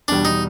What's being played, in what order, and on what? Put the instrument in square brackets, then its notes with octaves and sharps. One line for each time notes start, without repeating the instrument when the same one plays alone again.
[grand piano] E2 B2 G3 [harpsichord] D4
[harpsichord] D#4